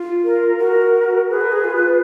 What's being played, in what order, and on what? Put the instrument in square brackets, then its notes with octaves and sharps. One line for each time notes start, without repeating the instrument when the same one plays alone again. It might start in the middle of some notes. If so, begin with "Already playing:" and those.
Already playing: [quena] F4
[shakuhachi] A#4
[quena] F#4 [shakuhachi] A#4
[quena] G#4 [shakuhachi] B4
[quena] A#4
G#4
F4
F4